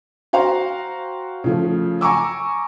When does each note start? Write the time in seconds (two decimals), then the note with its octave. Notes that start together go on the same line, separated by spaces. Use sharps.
0.33 F#4 C5 F5 G5 A#5 C6
1.44 C#3 F3 A3
2.01 G#5 A#5 C#6 D6 E6